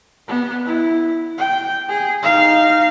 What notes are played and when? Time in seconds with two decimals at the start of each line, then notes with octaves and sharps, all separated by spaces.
0.28 B3
0.65 E4
1.38 G5
1.89 G#4
2.23 D#4 F5